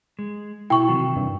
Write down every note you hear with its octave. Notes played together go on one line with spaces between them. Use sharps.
G#3
B2 E4 F#4 A4 G5 C#6
C3 D#3 E3 F#3
G2